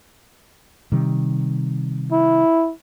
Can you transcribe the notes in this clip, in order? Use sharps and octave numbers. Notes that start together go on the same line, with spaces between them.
C3 D#3 G3
E4